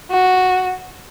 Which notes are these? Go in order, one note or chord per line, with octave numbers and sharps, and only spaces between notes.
F#4